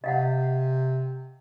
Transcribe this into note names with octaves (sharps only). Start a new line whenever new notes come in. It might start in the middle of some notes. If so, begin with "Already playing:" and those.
C3 D#5 F5 F#5